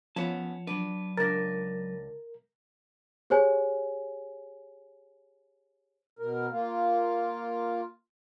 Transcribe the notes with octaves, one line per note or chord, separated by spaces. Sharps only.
F3 B3 C#4 C#5 F#5 A5
F#3 D4 B4
C#2 D4 A#4 A6 A#6
G4 G#4 C5 C#5 G#5
B2 A#4
A#3 F4